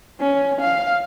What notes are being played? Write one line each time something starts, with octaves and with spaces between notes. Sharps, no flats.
C#4
F5